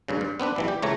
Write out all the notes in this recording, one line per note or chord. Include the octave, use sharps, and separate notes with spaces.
D2 G2 C#3
G2
B3 C4 D4 B4
A#1 E3 G3
G4
C#2 C#3 E3 A3 C#5 A#5